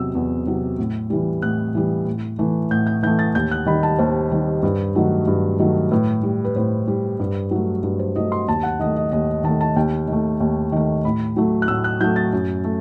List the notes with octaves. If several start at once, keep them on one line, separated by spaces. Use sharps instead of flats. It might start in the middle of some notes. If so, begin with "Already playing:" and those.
Already playing: E2 C3 F#3 E6
E2
C3 F#3
A2
E3 G3
A2 F#6
E3 G3
A2
E3 A3
A2 G6
G6
E3 A3 G6
A6
D#2 G6
F#6
D#3 G3 B5
A5
D#2 C5
D#3 G3
G2
D#3 F#3 A3
G2
D#3 F#3 A3
A2 B4
G3
B4
A2 C5
G3
G2
F#3 A3
G2
C5
F#3 A3 D#5
C6
D#2 A5
F#5
D#3 A3 D#5
D#5
D#2 D#5
D#3 A3 A5
A5
D#2 G5
D#3 A3
D#2
D#3 A3
A2 B5
F#3 A3
F#6
A2 E6
F#6
F#3 A3 G6
A6
F#2
A3